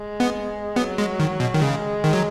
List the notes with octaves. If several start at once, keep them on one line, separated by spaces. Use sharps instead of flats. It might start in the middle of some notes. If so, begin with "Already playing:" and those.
Already playing: G#3
B3
F#3 B3
G#3
D#3
B2
D#3
C#3 G#3
D#3
F#3